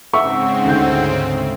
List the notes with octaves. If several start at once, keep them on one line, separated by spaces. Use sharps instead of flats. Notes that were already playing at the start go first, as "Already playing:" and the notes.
G#2 C#3 C4 E5 F#5 C#6
D2 G6